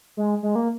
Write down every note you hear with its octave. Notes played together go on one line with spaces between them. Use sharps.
G#3
G#3
A#3